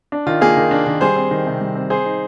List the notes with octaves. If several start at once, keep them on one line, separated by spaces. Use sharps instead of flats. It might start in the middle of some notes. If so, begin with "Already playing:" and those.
D4
D#3 F4
A#3 F4 G#4
D#3
D4
D#3
G3 G#4 C5
C4
D#3
C3
G3
C4
C4 G#4 C5
D#4